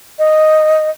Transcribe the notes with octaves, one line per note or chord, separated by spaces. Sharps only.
D#5